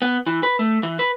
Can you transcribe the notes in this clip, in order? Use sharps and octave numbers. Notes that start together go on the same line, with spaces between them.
B3
E3
B4
A3
E3
B4